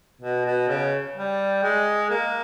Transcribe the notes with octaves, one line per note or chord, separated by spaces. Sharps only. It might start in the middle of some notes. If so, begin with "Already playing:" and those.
B2
B2
C#3
G3
G#3
A#3